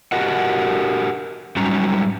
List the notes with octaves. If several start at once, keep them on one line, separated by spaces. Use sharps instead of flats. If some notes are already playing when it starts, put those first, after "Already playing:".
F#4 G4 A#4 D#5 F#5
G#2 F#3 G3 C#4 A#5